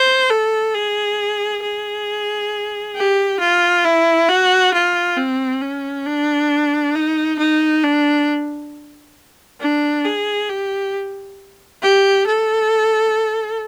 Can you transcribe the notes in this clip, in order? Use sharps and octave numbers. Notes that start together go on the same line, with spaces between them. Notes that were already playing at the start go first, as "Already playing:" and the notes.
Already playing: C5
A4
G#4
G#4
G4
F4
E4
F#4
F4
C4
C#4
D4
D#4
D#4
D4
D4
G#4
G4
G4
A4